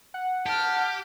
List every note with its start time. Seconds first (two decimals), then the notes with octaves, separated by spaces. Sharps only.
0.14 F#5
0.46 G4 A5 F6